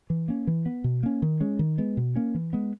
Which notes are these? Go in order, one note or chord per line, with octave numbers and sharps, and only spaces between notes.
E3
A#3 C#4
E3
B3
B2
A#3 C#4
D#3
G#3 C#4
D#3
G#3 B3
B2
A#3 C#4
E3
G#3 B3